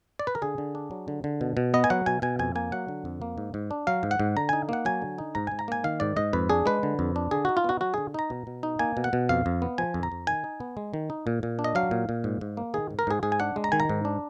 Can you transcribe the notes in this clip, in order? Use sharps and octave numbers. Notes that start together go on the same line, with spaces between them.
D5
B4
A#4
D3 G#4
D3
D4
F#3
D3
D3
B2
B2
B3 D#5
G#5
F#3 F#5
B2 G#5
B2 G#5
F2 G#5
A#3 G#5
F#3 F#5
D3
F2
A#3
G#2
G#2
D4
F#3 F5
G#2
F#5
G#2
D3 A#5
D#4 G#5
A#3 F#5
F#3 G#5
D3
D#4
G#2 A#5
G#2 G#5
A#5
A#3 G#5
D#3 F5
G#2 D5
G#2 D#5
F2 B4
D4 G#4
G#3 B4
D3
F2
D4
D3 G#4
D#4 F#4
F4
B3 F#4
F#3 F#4
D3 G#4
D#4 A#5
B2
B2
D#4
A#3 G#5
B2
F#5
B2
F2 F5
F2
B3
F3 G#5
F2
A#5
F2
D#3 G#5
D#4
B3
G#3
D#3
D#4
A#2
A#2
D4
D#5
F#3 F5
A#2
A#2
G#2
G#2
A#3
D#3 G#4
G#2
A#4
G#2 G#4
G#2 G#4
G#5
D4 F#5
G#3
A#5
D#3 G#5
A#5
G#2
D4